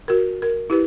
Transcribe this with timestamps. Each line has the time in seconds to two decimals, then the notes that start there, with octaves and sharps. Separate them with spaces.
0.08 F#4 A#4
0.42 A#4
0.70 E4 G4 B4